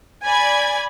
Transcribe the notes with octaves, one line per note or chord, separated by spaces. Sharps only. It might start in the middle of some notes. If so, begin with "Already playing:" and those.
D5 G#5 B5 G#6